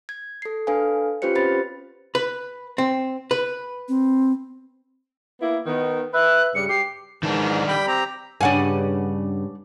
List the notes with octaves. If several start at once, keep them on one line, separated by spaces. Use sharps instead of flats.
G#6
A4 C7
D4 A4 B4 F5 G#5
C#4 F4 G4 B4 C5 C#7
C4 C#4 B4 C5 B5 A6
B4
C4
B4
C4
A#3 B3 E4
D#3 B3
B4 E5 F#6
G2 C#3 G3 C#7
G4 C7
G#2 D#3 E3 D4
G3 G5 B5
C4 G4 A#5
G2 C#3 D4 F#5 G#5